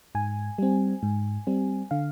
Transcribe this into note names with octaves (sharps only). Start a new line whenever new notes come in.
G#2 G#5
G3 C4
G#2
G3 C4
D3 F5